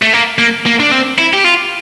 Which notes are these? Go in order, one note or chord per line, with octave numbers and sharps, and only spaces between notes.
A3
A#3
A#3
A#3
D4
C4
E4
G4
F4